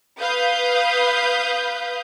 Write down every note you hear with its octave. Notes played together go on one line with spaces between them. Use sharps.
B4 F5 D#6 G6